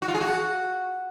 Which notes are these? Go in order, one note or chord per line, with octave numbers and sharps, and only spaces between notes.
F#4
F4
G#4
F#4